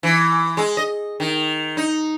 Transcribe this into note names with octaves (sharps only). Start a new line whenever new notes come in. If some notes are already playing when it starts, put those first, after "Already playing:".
E3
G#3
D#5
D#3
D#4